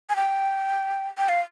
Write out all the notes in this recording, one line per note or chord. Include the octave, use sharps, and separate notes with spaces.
G#5
G5
G5
F5